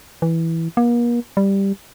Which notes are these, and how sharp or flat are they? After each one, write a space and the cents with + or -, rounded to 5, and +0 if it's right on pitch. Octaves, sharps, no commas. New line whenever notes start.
E3 -5
A#3 +40
G3 +5